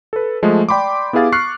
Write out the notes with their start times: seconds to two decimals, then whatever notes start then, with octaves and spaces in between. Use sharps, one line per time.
0.13 A4 B4
0.42 F3 G#3 A3
0.69 D5 G5 B5 C6 D6
1.13 B3 E4 G4 G#4 F5 A6
1.32 C#6 F6 F#6 C7